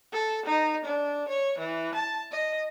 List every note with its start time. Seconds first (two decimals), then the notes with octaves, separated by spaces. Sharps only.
0.12 A4
0.46 D#4
0.85 D4
1.29 C#5
1.58 E3
1.94 A5
2.31 D#5